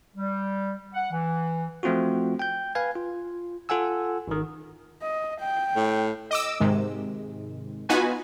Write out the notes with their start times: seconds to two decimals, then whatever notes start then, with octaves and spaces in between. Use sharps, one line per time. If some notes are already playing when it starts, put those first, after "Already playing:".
0.15 G3
0.94 F#5
1.11 E3
1.83 F3 A3 C4 F4 F#4
2.39 G5 G6
2.75 B4 F5 G#5 G#6
2.96 F4
3.69 F4 A4 F#5 G#5 E6
4.28 G#1 D#3
5.02 D#5
5.40 G5
5.76 A2
6.31 D#5 D6 E6
6.60 G#2 C3 D#3 G#3
7.89 B3 D#4 F4 F#4 B4 G#5